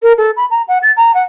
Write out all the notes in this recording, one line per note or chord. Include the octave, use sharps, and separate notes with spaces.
A#4
A4
B5
A#5
F#5
A6
A#5
F#5